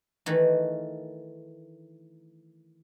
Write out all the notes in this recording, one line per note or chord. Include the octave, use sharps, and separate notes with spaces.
D#3 E3 A3